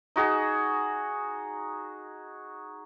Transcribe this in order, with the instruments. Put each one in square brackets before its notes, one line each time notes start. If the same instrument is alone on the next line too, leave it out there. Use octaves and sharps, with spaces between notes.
[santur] D#4 F#4 G#4